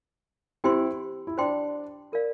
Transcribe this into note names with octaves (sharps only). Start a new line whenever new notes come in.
C4 E4 G4 C5 G5 C6
E4
D4 C5 G5 C6
F4 A#4 D5 F5